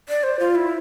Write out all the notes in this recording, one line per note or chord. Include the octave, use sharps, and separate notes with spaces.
D5
C5
F4
E4